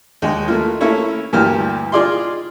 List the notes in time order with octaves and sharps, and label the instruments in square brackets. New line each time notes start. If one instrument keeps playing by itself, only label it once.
[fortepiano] D#2 G#3 D#4
A3 A#3 F4
A3 A#3 C#4 E4 C#5
D2 G2 E3 A#3 G4 F6
D#4 F4 G#4 D5 D#5 C6